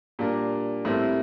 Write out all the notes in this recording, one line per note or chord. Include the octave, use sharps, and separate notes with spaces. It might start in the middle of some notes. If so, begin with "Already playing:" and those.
A#2 G3 D4 F4 A#4
A2 G3 C4 E4 A#4